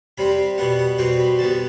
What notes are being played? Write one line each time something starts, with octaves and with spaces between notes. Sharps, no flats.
C3 G3 C4 B5
B2 G3 B3 F#5
F#5
B2 G3 C4 G5
B5
D3 G3 B3 A5